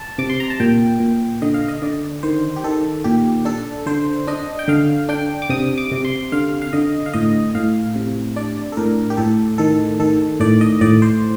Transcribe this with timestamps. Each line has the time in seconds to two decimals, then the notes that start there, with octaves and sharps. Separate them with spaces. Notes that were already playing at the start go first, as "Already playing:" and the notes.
Already playing: A5
0.18 C3 D6
0.30 C6
0.40 A#5
0.50 A5
0.60 A#2 G5
1.00 A#2
1.42 D3 D#5
1.54 F5
1.68 D#5
1.82 D3 D5
2.23 D#3 C5
2.56 G4
2.64 D#3 A4
3.04 A#2 G4
3.45 D4 A4
3.86 D3 C5
4.27 D4 D#5
4.59 G5
4.68 D3 F5
5.09 D4 G5
5.42 D6
5.50 C3 D#6
5.78 D6
5.92 C3
6.05 C6
6.32 D3 F5
6.62 F5
6.73 D3 D#5
7.06 F5
7.13 A2 D#5
7.55 A2 F5
7.96 C3
8.36 D4 D5
8.72 A4
8.77 A2 A#4
9.10 G4
9.17 A2 A4
9.58 D#3 A4
10.00 D#3 A4
10.40 A2 D5
10.61 D#5
10.81 A2 D5
11.02 C5